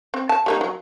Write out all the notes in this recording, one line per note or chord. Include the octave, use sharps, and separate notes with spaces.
C4
A5
G3 A#3 D#4
F#3